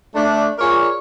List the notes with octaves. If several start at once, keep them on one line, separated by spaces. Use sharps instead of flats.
A3 D4
F4 G#4 A#4 C#5 D5